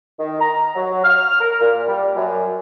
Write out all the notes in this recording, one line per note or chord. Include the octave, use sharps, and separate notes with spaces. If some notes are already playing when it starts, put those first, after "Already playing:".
D#3
A#5
F#3
F6
A#4
A#2
G3
F#2